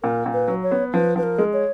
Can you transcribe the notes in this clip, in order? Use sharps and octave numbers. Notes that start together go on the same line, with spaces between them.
A#2 A#4
A#2
B4
F#3
C#5
B3
F3 B4
F3 B4
A#4
G#3
C#5